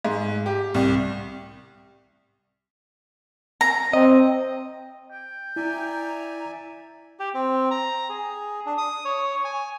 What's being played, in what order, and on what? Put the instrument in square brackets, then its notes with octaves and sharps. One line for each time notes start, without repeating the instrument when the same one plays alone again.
[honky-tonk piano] G#2
G4
C2
[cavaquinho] A#5
[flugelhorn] C4 [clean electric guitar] D#5
[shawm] G5
[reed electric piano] E4 [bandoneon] D5 E5 G#5 [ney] A#5
[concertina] G4
C4
A#5
G#4
D4
D#6
C#5
G#5